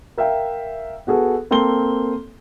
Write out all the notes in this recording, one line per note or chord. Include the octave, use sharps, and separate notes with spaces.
A#4 E5 F5 G5
B3 F#4 G#4 A4
A#3 C4 A4 C6 G7